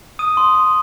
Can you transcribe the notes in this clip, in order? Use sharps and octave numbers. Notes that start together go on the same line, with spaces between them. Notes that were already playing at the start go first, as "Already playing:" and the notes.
D#6 D#7
C6
C6